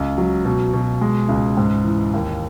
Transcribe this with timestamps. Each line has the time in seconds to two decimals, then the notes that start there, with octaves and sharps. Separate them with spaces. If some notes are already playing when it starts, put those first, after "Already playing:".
Already playing: C#2
0.18 F#3
0.45 B2
0.73 B2
1.01 G#3
1.29 C#2
1.57 G#2
1.84 E3
2.14 D#2